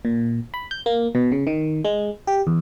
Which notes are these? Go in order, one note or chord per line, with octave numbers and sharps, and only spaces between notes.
A#2
B5
G6
A#3
B2
C#3
D#3
G#3
G4
E2